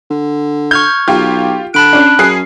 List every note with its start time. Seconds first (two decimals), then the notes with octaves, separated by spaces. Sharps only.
0.10 D3
0.71 C#6 F6 G6 G#6
1.08 B1 F4 G4
1.74 D3 A5 B5 F#6 D7
1.93 C#4 D4
2.19 F#2 C#4 G#4 C7